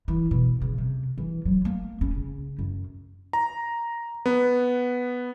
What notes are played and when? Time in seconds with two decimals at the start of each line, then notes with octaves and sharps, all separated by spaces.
0.08 E3
0.31 B2
0.62 C#3
0.78 C3
1.18 E3
1.45 F#3
1.65 A#3
2.01 C#4
2.15 C#3
2.58 F#2
3.33 A#5
4.26 B3